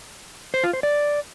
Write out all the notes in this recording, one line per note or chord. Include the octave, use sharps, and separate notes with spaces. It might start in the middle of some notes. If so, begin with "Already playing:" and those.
C5
F4
C5
D5